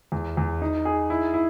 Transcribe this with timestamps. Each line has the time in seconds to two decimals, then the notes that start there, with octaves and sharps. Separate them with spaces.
0.12 E2
0.37 E2
0.61 D#4
0.85 G#4
1.10 E4
1.34 E4